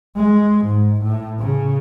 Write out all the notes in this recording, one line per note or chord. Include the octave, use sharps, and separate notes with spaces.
G#3
G#2
A2
C#3